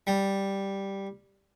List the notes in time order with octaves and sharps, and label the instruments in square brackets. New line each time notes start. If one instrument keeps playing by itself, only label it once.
[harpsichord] G3